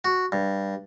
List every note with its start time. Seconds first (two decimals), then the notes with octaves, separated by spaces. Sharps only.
0.05 F#4
0.32 G2